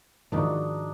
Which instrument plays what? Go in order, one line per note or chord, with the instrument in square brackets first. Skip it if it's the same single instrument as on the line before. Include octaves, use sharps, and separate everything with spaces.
[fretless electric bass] G#2 D#3 F3 [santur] D4 D#4 F#4